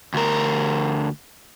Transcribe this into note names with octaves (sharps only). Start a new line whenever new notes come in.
D2 A#4